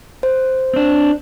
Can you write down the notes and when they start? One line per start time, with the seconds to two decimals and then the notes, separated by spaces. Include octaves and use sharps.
0.23 C5
0.74 C4 D4